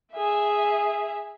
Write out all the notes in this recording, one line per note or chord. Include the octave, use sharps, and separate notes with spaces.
G#4 E5